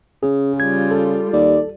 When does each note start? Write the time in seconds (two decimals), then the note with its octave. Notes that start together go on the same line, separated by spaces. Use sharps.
0.23 C#3 C#4 G#4
0.60 G3 F4 G#6
0.91 A4
1.33 D#2 D5